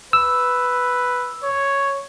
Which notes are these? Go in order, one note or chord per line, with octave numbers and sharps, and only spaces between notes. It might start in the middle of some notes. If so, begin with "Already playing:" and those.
B4 E6
C#5